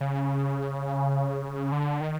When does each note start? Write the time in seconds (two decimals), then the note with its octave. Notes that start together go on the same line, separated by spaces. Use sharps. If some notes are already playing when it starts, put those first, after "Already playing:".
0.01 C#3
1.72 D3
2.01 D#3